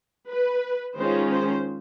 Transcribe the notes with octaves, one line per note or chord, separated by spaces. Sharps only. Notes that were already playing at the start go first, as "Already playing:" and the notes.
B4
D#3 G#3 C#4 F4 C5
C5